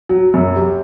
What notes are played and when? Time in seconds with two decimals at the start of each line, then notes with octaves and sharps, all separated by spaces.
0.09 F#3
0.34 F#2
0.56 G4